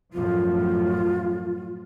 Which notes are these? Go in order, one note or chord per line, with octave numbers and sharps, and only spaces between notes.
F#2 A2 F3 F4